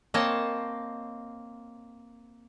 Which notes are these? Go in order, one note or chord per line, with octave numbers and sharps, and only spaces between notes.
A#3 C4 C#5 D#5 A5